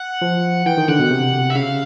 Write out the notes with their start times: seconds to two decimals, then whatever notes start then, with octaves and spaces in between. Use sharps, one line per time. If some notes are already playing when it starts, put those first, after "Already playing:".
Already playing: F#5
0.22 F3
0.66 E3 G5
0.77 D#3
0.88 D3 F#5
0.99 B2
1.11 C3
1.50 E5
1.55 C#3 F5